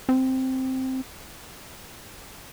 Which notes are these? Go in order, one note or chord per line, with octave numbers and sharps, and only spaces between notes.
C4